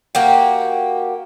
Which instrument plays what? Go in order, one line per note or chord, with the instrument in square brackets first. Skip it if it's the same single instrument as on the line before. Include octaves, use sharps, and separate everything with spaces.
[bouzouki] A#3 F#4 G4